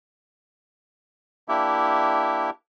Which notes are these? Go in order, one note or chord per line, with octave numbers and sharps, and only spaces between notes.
A#3 D4 E4 G4 E5